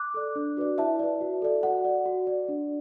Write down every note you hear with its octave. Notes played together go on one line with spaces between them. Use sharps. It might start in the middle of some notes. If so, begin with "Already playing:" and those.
Already playing: D6 F#6
A4 D5
D4
F#4 B4 D5
E4 E5 A5
B4 D5
F#4
A4 D5
F#4 F#5
D5
F#4
D5
D4